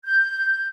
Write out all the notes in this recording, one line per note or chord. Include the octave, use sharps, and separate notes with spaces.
G6